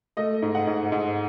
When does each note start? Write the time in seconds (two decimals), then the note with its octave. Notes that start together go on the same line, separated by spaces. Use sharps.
0.17 A3 D#5
0.42 G#2
0.55 F#5
0.67 G#2
0.92 G#2